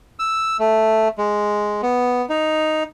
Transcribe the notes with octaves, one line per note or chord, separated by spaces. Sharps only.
E6
A3
G#3
B3
D#4